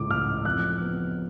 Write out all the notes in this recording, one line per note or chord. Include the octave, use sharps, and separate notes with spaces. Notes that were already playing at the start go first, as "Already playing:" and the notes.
Already playing: C#2 A2 D6
A1 F6
F2 F#6
B3